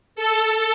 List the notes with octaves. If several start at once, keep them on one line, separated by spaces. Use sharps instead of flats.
A4